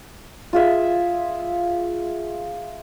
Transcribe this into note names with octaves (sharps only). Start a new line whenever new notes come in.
F4 G#4 E5